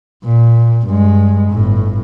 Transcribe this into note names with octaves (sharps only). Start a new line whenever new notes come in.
A#2
G2 G#3
G1 A2